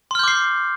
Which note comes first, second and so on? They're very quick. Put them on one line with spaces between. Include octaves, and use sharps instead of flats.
C6 F6 G6 D6 C7